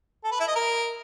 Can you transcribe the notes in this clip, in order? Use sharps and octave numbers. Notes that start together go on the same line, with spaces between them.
A4
B4
E4
D#5
A#4